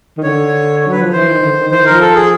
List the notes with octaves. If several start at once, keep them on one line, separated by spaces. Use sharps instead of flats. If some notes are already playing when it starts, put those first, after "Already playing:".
D#3
D3 C#5
C#5
F#3 B4
F3
E3 C5
D#3
D3
D#3
E3 C5
D#3
A#4
F3
A4
G#4